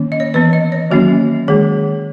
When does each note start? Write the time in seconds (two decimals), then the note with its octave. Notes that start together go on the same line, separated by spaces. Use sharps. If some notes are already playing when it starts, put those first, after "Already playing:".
Already playing: D#3 A#3 C#4
0.12 D#5
0.20 C#5
0.34 E3 B3 B4
0.53 D#5
0.72 C#5
0.91 D#3 F#3 A#3 C#4 F#4
1.48 D#3 G#3 G#4